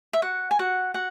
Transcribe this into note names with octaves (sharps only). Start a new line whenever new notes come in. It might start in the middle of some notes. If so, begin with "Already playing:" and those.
E5
F#4 F#5
G#5
F#4 F#5
F#4 F#5